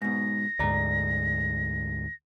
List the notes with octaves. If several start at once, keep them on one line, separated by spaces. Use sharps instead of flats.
G#2 B2 A#6
D2 G#2 D5 A#5